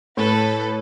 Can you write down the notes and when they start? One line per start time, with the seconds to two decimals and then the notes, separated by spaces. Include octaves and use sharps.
0.17 A2 A4 B4